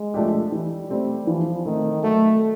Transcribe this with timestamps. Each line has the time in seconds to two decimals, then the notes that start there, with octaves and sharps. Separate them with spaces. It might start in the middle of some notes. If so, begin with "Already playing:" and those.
Already playing: G#3
0.14 F3 A3 D4 G4
0.52 E3 G3
0.90 G3 A3 C4
1.27 E3 F3
1.65 D#3 A3 C4
2.03 F#3 A3